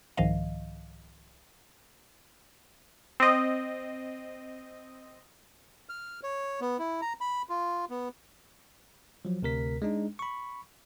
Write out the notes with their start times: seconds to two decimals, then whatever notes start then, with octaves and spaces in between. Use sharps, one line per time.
0.17 C2 G#2 D#3 F3 D#5 F5
3.20 C4 D#5
5.89 F6
6.23 C#5
6.61 B3
6.79 E4
7.02 A#5
7.21 B5
7.49 F4
7.90 B3
9.25 F3 F#3
9.42 D2 C3 A#4 B6
9.82 G#3 D4 D#4
10.19 B5 C#6